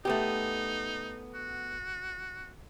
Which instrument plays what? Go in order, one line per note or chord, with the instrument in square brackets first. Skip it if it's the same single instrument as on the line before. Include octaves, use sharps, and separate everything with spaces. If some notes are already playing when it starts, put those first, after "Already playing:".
[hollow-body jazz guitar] A3 B3 G4 [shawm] D#4
[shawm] F#4